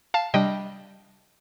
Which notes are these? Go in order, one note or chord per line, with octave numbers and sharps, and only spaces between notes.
F5 A5
C3 G3 D4 D#5 G5